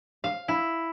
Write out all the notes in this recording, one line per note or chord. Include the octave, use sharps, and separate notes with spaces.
F5
E4